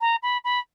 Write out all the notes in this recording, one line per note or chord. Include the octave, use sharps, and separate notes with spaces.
A#5
B5
B5